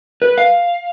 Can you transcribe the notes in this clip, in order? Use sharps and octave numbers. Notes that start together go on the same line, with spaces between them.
B4
F5